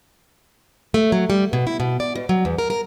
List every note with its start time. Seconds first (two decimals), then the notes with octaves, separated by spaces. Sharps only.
0.94 A3
1.12 F#3
1.30 G3
1.53 B2
1.67 E4
1.80 B2
2.00 D5
2.16 B2
2.29 F#3
2.45 E2
2.58 A#4
2.70 A#4